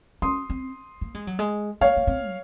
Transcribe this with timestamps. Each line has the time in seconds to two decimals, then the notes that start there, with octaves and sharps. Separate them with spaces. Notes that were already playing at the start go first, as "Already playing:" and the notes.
0.22 C#4 C6 D#6
0.50 C4
1.01 A#3
1.14 G#3
1.27 F#3
1.39 G#3
1.81 A#3 C#5 F5
1.97 A#3
2.07 C4
2.27 F#3